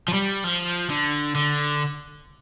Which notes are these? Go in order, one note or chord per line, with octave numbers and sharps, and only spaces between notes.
F3
G3
F3
D3
D3